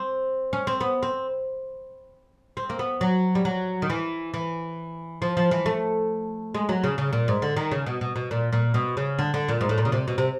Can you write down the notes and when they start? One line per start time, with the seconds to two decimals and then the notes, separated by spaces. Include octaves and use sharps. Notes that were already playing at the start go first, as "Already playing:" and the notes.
Already playing: C4
0.53 C#4
0.67 C4
0.80 B3
1.03 C4
2.57 C4
2.69 A#3
2.79 B3
3.01 F#3
3.35 G3
3.45 F#3
3.82 D#3
3.90 E3
4.34 E3
5.22 F3
5.37 F3
5.51 E3
5.66 A3
6.54 G#3
6.69 F#3
6.84 C#3
6.98 C#3
7.13 A#2
7.28 G#2
7.42 D3
7.56 D#3
7.71 C#3
7.86 B2
8.01 B2
8.16 B2
8.31 A#2
8.52 A#2
8.74 B2
8.97 C#3
9.19 D3
9.34 D3
9.48 A#2
9.61 G#2
9.69 A2
9.78 A#2
9.85 C#3
9.92 C3
10.08 B2
10.18 C3